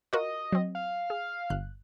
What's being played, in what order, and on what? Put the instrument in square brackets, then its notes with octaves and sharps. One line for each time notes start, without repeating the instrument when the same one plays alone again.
[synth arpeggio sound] F4 F#4 A#4 [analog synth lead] D#5
[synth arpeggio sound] F#3 C4
[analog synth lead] F5
[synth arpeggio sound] G#4
G1 F#6